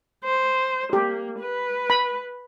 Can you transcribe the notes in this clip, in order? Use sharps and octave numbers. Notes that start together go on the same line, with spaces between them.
C5
A#3 G4
B4
B5